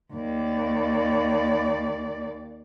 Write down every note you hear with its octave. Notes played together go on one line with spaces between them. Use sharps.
D#2 D5